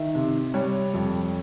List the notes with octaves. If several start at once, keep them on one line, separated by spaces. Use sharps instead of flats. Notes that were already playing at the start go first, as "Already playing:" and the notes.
Already playing: D#3 E5
C3
G3 C#5
F2